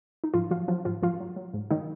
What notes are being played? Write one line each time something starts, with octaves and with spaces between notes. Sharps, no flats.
D#4
G#2 F3 F4
F3 F#3 F4
F3 F#3 F4
G#2 F3 F4
G#2 F3 F4
F#3
F#3
G#2
D#3 F#3 D#4